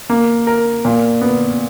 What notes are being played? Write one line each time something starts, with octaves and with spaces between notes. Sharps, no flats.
A#3
A#4
A#2
B3